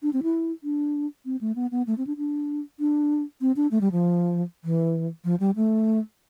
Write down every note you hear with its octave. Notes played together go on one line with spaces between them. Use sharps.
D4
C4
E4
D4
C4
A3
B3
B3
A3
C4
D4
D4
D4
C4
D4
A3
G3
F3
E3
F3
G3
A3